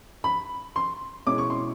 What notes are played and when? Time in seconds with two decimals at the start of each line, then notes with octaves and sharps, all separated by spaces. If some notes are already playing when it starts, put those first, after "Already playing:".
0.24 B5
0.76 C6
1.27 B2 G#3 C#4 E4 D6
1.38 C#6
1.50 C6